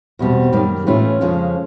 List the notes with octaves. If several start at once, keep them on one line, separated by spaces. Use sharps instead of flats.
E2 B2 G3 C4
F#2 D#3 G3 A#3
A2 E3 A3 C#4 F4
F2 C#3 F3 G#3 C#4